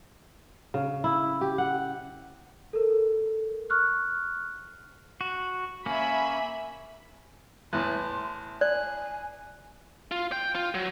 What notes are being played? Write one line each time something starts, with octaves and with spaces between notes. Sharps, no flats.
C#3
E4
G4
F#5
A4 A#4
C#6 F6 F#6
F#4
A#3 C#4 E5 G#5 B5
E2 A2 C6 F#6
D5 G#5 F#6
F4
G5
F4
F#3